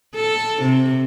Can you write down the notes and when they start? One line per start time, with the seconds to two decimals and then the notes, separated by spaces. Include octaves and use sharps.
0.15 A4
0.63 C3